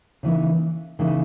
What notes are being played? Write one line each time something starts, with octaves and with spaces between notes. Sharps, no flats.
C#3 E3 A#3 D#4
C#3 E3 A#3 D#4